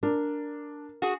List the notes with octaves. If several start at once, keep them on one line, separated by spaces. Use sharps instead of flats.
D4 A#4
F#4 G#4